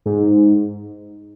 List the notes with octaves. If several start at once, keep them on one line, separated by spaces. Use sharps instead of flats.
G#2